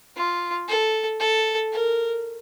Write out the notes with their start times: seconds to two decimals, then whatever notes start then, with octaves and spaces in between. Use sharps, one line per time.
0.16 F4
0.69 A4
1.20 A4
1.72 A#4